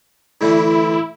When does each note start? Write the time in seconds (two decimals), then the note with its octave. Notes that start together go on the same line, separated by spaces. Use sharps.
0.41 A2 D3 E3 E4